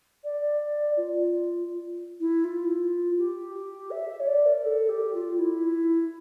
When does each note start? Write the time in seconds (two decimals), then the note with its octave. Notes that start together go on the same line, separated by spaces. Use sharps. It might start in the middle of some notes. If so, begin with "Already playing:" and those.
0.24 D5
0.97 F4
2.20 E4
2.44 F4
3.18 G4
3.55 G4
3.91 E5
4.09 E5
4.20 C#5
4.28 D5
4.46 A#4
4.64 A4
4.89 G4
5.14 F4
5.38 E4